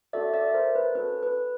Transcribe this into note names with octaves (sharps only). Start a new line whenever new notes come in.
C#4 F#4 A4 D5 E5
D5 E5
A#4 C5
B4
C#4 F#4 A4 B4
B4